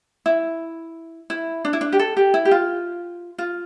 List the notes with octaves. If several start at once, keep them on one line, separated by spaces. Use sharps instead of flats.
E4
E4
D4
E4
D4
G4
A4
G4
E4
G4
F4
F4